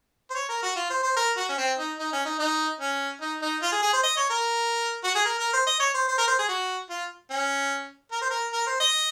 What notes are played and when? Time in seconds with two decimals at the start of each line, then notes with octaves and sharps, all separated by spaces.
0.30 C5
0.35 C#5
0.49 A#4
0.63 F#4
0.76 F4
0.90 C5
1.03 C5
1.16 A#4
1.37 F#4
1.49 C#4
1.58 C4
1.78 D#4
1.99 D#4
2.13 C#4
2.26 D#4
2.39 D#4
2.80 C#4
3.21 D#4
3.42 D#4
3.62 F4
3.72 G#4
3.82 G#4
3.93 C5
4.03 D#5
4.17 C#5
4.30 A#4
5.04 F#4
5.15 G#4
5.25 A#4
5.39 A#4
5.53 C5
5.67 D#5
5.80 C#5
5.94 C5
6.08 C5
6.18 A#4
6.28 C5
6.39 G#4
6.48 F#4
6.90 F4
7.30 C#4
8.12 A#4
8.22 C5
8.31 A#4
8.53 A#4
8.67 C5
8.80 D#5